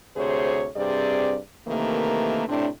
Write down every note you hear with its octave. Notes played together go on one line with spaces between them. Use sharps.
D2 C3 G#4 C5 C#5
G2 C3 C4 G#4 D5
C3 D#3 E3 A3 A#3
A2 C3 C4 D4